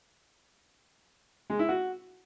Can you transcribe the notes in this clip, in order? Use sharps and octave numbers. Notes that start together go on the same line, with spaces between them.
G#3
E4
F#4